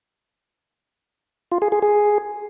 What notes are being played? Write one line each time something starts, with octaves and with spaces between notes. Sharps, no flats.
F4
G#4
G#4
G#4